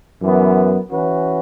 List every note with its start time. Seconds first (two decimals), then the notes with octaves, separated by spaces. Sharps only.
0.21 F#2 E3 B3
0.91 E3 C#4 F#4 B4